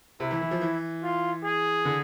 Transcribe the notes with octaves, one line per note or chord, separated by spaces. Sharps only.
C3 E4
E3
E3
F3
E3
F4
G#4
D3